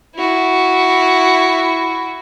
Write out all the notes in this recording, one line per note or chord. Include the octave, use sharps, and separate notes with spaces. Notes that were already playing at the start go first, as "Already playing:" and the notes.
E4 F#4